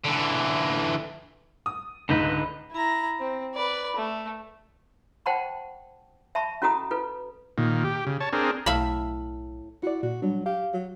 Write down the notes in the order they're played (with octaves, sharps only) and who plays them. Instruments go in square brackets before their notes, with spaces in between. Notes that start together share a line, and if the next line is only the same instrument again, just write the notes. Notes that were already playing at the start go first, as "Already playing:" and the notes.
[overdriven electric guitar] D3 E3
[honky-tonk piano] D#6
[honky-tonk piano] C#2 G#2 [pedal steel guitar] D3 D#4 B4
[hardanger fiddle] E4 A#5
C4
B4 D5
A3
[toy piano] C5 F#5 G5 A5 B5 C#6
E5 A5 B5 C#6
C#4 F4 F#4 A4 A#5 D#6
F4 A4 B4
[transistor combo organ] A#2 D#3
G4
C#3
C#5 A5
C4 D4 G#4 A#4
[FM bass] B1 [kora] A2 [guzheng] E5 F5 B5
[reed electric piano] E4 D5 [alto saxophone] F#4
[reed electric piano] A#2 [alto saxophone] F#4
[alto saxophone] F#3 [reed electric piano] G3 D4
[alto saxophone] G4 [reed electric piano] F5
[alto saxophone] F#3